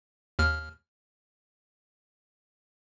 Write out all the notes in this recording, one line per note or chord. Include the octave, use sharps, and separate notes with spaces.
D#2 F6